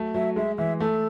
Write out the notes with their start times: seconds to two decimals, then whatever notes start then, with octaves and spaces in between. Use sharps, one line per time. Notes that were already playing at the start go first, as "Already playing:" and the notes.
Already playing: F#3 A3
0.14 F#3 E5
0.36 G#3 E5
0.58 E3 E5
0.80 A3 A4